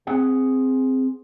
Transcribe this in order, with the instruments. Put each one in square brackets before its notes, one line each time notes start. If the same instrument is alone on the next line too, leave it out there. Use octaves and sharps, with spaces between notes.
[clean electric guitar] C4 G#4 F#5